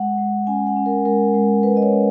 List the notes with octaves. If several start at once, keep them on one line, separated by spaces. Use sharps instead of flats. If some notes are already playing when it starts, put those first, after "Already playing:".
Already playing: G#3 F#5
G#3
C#4 G#5
F#5
C#4
A#4
G#3 A#4
G#3
G#3 B4
D#5
C#5
C#4